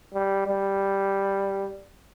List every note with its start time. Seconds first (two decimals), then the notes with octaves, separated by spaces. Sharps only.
0.14 G3
0.47 G3